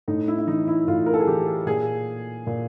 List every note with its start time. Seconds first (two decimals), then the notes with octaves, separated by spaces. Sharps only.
0.08 A2 D#4
0.28 E4
0.38 E4
0.47 E3 D#4
0.68 E4
0.87 A2 F4
1.06 A#4
1.14 A4
1.20 G#4
1.27 E3 G4
1.66 A#2 G#4
2.47 A#2